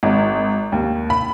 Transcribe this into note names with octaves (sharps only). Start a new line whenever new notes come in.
G#1
D#2
B5